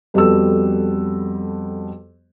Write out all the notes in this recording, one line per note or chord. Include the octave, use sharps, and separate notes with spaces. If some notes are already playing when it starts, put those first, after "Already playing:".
F2 G3 B3 F#4 A4 E6